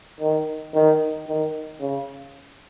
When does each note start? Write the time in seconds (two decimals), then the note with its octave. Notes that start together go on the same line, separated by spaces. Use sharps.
0.20 D#3
0.74 D#3
1.27 D#3
1.80 C#3